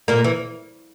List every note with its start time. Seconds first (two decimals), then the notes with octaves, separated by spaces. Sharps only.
0.08 A#2 A#3
0.24 E3